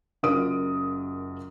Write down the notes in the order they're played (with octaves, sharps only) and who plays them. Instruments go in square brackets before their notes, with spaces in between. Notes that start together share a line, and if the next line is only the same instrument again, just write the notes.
[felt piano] F#1 F#2 F4 A#4 D#6 D7